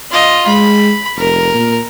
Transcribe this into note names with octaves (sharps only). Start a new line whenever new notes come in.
F4 D#5
G#3 B5
F1 A#4
A#2